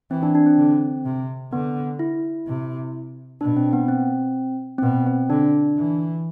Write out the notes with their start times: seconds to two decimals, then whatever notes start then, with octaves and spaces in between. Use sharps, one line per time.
0.11 E3 C4
0.23 D4
0.35 D4
0.46 C4
0.58 D3
1.05 C3
1.52 D3 B3
1.99 E4
2.47 C3
3.41 B2 D4
3.56 C4
3.73 B3
3.88 C4
4.78 C4
4.83 B2 B3
5.07 C4
5.30 D3 D4
5.77 E3